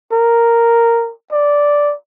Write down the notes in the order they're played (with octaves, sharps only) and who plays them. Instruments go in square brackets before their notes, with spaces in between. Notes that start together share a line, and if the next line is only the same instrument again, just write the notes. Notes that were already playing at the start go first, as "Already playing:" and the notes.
[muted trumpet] A#4
D5